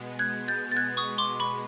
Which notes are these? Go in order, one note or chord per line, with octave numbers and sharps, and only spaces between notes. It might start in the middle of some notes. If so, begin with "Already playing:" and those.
Already playing: B2 G#3 B3
F#6 G#6
G6 A6
A6
F#6 G#6
C#6 D#6
C6 D6
B5 C#6